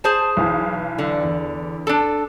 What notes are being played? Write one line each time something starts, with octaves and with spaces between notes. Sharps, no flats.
G#4 C5 A5
B1 E3 F5
D3
E2
D4 A4